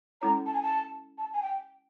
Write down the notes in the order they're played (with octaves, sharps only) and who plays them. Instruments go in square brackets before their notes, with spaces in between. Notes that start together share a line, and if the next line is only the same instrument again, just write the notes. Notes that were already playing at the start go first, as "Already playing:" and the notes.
[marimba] G#3 C#4 E4 A4 C#5 [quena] A#5
[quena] A5
G#5
A5
A5
G#5
G5